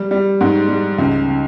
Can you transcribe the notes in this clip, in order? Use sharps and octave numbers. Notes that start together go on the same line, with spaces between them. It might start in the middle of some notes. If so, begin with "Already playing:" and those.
Already playing: G3
G3
G#2
G3
C#2
C#3